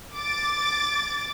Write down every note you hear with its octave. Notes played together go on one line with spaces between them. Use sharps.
D6 A6